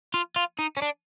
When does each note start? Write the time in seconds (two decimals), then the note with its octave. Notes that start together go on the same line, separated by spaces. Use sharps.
0.14 F4
0.36 F4
0.59 D#4
0.77 C#4
0.82 D4